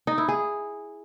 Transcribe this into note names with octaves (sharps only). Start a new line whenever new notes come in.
D#4
E4
G#4